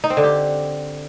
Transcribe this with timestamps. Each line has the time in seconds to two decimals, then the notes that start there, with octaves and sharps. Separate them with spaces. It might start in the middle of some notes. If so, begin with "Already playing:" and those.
0.04 D#4
0.10 C4
0.17 D3
0.24 G4